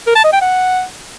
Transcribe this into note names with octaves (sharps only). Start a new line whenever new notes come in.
A#4
A5
D#5
G5
F#5